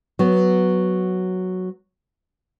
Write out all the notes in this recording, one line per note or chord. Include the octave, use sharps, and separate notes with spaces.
F#3 B3